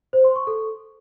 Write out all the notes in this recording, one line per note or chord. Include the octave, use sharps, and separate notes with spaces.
C5
C6
C#6
A4